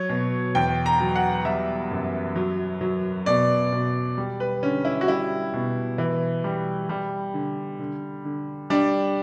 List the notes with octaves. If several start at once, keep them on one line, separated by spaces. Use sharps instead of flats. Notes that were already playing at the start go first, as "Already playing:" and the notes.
Already playing: F#3 C#5
B2
E2 G5
A#5
F#3
F#5
G3 E5
F#2
F#3
F#3
B2 D5
B2
G3
B4
D3 C#4
E4
F#4
G3 E4
B2
E3
G3
G3
D3
D3
D3
G3 D4